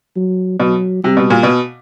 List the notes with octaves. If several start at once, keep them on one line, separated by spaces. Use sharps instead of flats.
F#3
B2 F#3
C3 G3
B2
A#2
B2